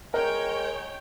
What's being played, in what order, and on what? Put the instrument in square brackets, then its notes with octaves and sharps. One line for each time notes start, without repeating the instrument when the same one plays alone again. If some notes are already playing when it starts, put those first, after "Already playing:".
[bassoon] G#3 [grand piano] A#4 [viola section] C#5 G5